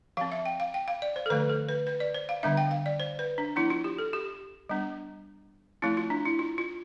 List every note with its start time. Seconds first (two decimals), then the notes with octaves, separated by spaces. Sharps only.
0.17 F3 C4 F5
0.32 E5
0.46 G5
0.60 F5
0.74 G5
0.88 F5
1.02 D5
1.16 C5
1.26 A4
1.30 D3 F3 A3 B4
1.50 A4
1.69 B4
1.87 B4
2.00 D5
2.14 C5
2.29 F5
2.43 D3 G3 B3 D4 E5
2.57 G5
2.71 F5
2.86 D5
3.00 C5
3.19 B4
3.38 D4
3.56 F3 B3 D4 E4
3.70 F4
3.84 G4
3.98 A4
4.13 G4
4.69 G3 B3 D4
5.82 F3 A3 C4 E4
5.97 F4
6.10 D4
6.25 E4
6.39 F4
6.58 F4